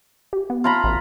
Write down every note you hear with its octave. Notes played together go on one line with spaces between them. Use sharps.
G4
B3
F4 A#5 B5
A1